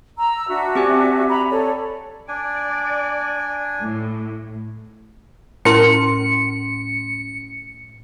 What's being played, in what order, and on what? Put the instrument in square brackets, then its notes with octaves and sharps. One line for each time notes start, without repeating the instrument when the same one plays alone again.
[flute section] A#5 E6
D4 F#4 E5
[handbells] C4 G4 G#5
[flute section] A#5 B5
A4 C#5 D5
[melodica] D4 G#5 [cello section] D5
[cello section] A2
[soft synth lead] A2 [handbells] C#4 C6 [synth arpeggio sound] E4 A#4 A5 [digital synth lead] C#7